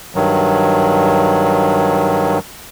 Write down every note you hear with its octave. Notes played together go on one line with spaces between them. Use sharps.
G2 D#3 F#3